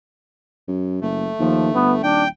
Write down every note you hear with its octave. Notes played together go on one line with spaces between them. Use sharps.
F#2
F#1 A3
D#2 F3
G1 B3
D#1 D4 G5